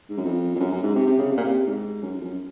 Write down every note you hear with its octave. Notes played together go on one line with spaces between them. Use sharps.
G#2
F#2
F2
F2
F#2
F#2
G#2
C3
C3
C#3
C3
A#2
C3
G#2
F#2
F#2
F2
F#2